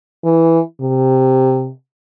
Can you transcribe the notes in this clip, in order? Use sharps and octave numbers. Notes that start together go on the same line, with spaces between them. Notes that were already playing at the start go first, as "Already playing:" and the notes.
E3
C3